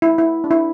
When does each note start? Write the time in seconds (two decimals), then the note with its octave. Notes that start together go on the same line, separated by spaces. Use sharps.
0.02 E4
0.18 E4
0.44 D4
0.51 E4